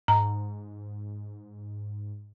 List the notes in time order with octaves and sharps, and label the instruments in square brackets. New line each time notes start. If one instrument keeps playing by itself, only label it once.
[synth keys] G#2 [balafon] A#5